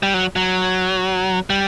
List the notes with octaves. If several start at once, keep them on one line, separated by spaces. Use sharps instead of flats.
G3
F#3
F#3
G3